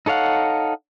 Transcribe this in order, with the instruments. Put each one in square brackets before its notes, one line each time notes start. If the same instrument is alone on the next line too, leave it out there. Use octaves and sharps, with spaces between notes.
[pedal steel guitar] D#4 A4 C#5 F5 F#5